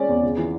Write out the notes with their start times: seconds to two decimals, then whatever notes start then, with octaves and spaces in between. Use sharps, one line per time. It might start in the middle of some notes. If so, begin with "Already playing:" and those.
Already playing: G#3 C#4 D5
0.09 E2
0.23 C#3
0.37 E3